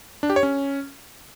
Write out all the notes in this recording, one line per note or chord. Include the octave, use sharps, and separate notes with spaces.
D4
G4
C#5
C#4